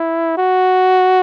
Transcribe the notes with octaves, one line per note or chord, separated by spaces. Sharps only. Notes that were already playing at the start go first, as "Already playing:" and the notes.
Already playing: E4
F#4